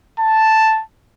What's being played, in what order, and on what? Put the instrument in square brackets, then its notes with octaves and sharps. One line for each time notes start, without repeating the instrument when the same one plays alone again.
[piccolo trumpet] A5